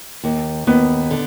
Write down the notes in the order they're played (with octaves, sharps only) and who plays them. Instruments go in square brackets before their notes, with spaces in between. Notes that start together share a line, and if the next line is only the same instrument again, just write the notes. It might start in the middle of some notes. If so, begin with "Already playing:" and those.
[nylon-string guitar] D#2
[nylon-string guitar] D#2 [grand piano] B3
[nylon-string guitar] D3